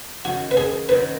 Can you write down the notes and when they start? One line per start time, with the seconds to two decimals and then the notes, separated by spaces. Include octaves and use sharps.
0.25 F#2 D#3 F#3 F#4
0.51 B4
0.57 G#4
0.89 F#2 D#3 F#3 B4